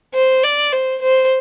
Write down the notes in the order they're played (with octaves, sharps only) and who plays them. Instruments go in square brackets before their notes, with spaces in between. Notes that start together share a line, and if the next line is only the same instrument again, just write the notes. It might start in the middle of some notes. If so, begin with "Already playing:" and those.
[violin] C5
D5
C5
C5